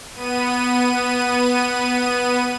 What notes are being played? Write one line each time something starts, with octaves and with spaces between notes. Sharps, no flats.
B3 D#7